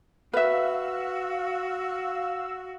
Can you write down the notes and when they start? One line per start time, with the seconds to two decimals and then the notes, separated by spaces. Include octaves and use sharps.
0.33 F#4 B4 E5 F5 E6